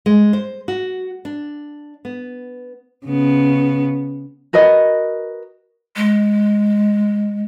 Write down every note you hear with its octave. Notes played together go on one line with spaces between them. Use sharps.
G#3
C5
F#4
D4
B3
C#3 B3
F#4 A#4 B4 D#5
G#3